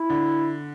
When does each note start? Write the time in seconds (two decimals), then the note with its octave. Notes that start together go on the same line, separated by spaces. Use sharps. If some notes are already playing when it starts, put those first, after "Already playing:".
Already playing: E4
0.10 D3